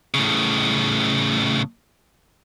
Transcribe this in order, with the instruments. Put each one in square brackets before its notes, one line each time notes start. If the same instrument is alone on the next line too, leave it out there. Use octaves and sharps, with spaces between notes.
[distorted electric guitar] A2 C#3